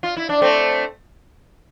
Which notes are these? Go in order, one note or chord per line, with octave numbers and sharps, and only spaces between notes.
F4
E4
D4
A3 C4